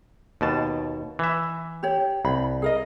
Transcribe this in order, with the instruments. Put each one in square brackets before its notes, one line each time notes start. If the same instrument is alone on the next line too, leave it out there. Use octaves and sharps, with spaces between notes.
[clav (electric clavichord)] D#2 B2 A5
E3 E5
[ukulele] G4 C#5
[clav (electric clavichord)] C2 [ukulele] B5
[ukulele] G#4 A#4 D#5